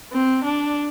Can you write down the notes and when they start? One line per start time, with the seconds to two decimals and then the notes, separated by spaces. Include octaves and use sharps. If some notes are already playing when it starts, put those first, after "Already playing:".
0.13 C4
0.44 D4